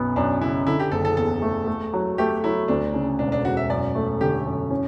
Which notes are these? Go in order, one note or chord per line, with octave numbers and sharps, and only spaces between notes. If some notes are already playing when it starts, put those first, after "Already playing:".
Already playing: B1 F#2 B3
F#2 D4
C#3 E4
D3 E4
G4
F#1 A4
A4
E2 A4
A3
A3
F#3
A3 G4
F#3 E4
D2 D4
C#3
E1 D4
D4
E1 F#4
E5
F#2 D5
A3
D3 G4
F#2
C#4